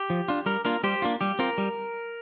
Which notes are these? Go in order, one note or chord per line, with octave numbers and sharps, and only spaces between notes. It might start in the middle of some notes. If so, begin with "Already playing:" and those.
Already playing: G4
F3
D4 F4
G3 A#4
A#3 D4 F4 A#4
G3 G4 C5
A#3 D4 F4
G3 G4
C4 F4 A#4
G3